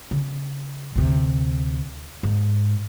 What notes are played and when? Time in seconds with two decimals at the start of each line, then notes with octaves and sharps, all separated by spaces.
0.11 C#3
0.96 D2 C3
2.23 G#2